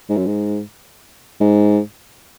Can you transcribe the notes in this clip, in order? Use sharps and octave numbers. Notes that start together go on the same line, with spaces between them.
G#2
F#2
G#2
G#2